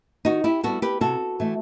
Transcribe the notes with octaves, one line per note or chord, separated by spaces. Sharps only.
D#3 D#4 F#4
E4 G4
G3 B3 F#4 A4
G4 B4
C3 F#4 A4
E3 A3